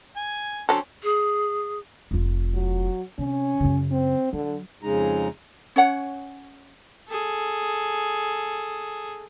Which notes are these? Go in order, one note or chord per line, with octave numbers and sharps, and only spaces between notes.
G#5
D3 F#3 C4 C#4 A4
G#4
F1 F4
F#3
C3 C#4
F#2 C#3
C4
D3 F#3
F2 C#3 G#3 D#4 A#5
C#4 C#5 F#5
G#4 A4